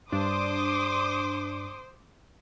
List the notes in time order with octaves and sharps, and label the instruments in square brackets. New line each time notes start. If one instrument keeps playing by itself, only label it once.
[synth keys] G2 D4 [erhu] C5 [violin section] C6 D6 D#6